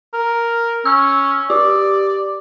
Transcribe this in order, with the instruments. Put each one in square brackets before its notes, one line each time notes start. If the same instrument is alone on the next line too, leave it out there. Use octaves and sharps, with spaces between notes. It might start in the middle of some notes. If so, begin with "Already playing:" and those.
[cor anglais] A#4
[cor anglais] C#4 [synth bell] E6
[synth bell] G4 [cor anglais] D5